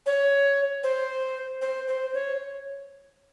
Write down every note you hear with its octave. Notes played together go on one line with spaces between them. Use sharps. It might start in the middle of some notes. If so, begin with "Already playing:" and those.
C#5
C5
C5
C5
C#5